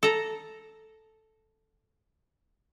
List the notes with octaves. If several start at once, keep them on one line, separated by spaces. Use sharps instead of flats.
A4 A#5